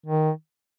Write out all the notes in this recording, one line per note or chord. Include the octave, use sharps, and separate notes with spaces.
D#3